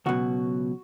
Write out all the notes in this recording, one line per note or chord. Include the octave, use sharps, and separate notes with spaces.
C#2 B2 F#3 F#4